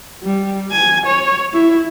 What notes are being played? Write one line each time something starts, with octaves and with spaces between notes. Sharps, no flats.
G3
G#5
C#5
E4